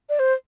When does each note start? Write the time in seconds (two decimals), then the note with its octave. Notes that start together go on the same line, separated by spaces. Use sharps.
0.09 D5
0.19 C5